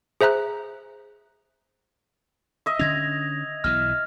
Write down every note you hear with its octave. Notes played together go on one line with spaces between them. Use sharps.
G#4 C5 E5 A#5 F#6
D#5 E5
D3 C#4 G#6 A#6 F7
B1 B2 E3 F6